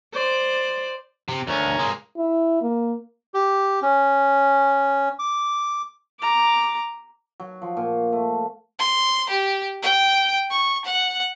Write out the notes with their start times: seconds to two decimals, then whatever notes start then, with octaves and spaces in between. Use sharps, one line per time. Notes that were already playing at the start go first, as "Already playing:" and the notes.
0.13 C5 D5
1.28 C3
1.47 D2 C#4 A#4
1.79 G#3 A#3
2.17 E4
2.62 A#3
3.34 G4
3.82 C#4
5.19 D6
6.20 A#5 D6
7.40 F#3
7.62 F3
7.77 A#2
8.12 A3
8.79 C6
9.29 G4
9.82 G5
10.50 C#6
10.85 F#5